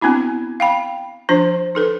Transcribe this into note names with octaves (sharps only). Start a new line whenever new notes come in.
B3 C4 D4 E4 F#4
F5 G5 B5
F3 D4 F4 C5
D#4 A4 B4